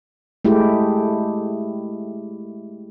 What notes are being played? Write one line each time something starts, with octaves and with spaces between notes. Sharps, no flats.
G#3 A3 E4 G4